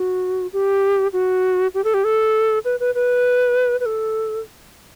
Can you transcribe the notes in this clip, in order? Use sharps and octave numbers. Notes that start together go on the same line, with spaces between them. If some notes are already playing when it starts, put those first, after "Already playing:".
Already playing: F#4
G4
F#4
G4
A4
G4
A4
B4
B4
B4
B4
A4